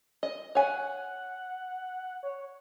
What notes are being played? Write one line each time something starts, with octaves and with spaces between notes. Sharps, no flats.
D#5
C#5 F#5 G#5
C#5